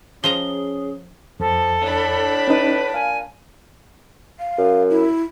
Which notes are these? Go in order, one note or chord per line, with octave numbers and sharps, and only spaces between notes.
F3 C#4 G#4 D#5 A#5 G7
F2 F3 A4
A2 D4 B5
C#4 D#4 B4
A#2 F5 G#5
F5
F#2
E4